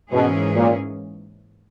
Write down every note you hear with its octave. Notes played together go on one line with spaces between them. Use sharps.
G#2 B2 E3 A#3 C#4 G#4
A#2